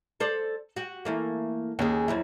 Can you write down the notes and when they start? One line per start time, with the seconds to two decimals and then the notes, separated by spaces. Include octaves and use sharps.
0.20 A4 C5 D5
0.76 F#4 G4
1.05 E3 A3 A#3
1.79 D#2 C#4 G#4
2.08 F2 F#3 E4